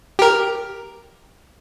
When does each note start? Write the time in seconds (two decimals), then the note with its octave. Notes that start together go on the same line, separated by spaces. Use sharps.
0.19 G4 A#4